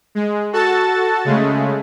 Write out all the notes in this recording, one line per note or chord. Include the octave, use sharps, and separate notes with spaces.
G#3
F#4 A4 A5 A6
C#3 G#3 A3